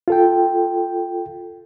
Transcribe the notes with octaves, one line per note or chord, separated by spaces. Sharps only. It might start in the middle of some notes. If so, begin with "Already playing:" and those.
F4 A4 G5